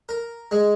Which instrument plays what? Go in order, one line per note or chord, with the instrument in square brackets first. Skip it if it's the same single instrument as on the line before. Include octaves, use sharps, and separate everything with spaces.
[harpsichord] A#4
G#3